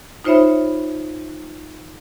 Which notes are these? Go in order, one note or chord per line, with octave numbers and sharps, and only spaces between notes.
D#4 F4 C5 C#5 E5 B5